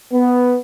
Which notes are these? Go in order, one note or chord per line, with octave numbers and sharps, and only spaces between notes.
B3